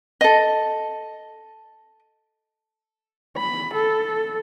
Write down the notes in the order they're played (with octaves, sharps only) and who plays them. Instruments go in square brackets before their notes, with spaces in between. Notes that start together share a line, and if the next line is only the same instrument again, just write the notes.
[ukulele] A4 D#5
[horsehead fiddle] B5
A4